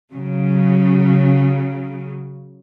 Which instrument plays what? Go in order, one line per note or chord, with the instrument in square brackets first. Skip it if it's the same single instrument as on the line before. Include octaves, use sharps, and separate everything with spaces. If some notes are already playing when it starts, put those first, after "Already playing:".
[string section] C#3 F#3